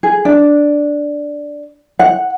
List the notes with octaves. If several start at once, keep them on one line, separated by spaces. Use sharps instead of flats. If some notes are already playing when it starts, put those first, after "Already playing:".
G#4
D4
F#5